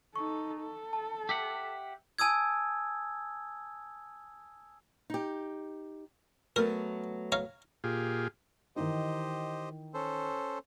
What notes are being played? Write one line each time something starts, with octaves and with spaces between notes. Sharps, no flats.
D#4 A4 C#6
A4
A5
G4 E5 F#5
G#5 A5 D#6 E6 G#6
D#4 G4
F#3 A3 B3 A#4
C#5 F5 A#5
A#2 F4 G4 G#4
D#3 E3 D#4 G4 C5 D#5
C#4 A4 C5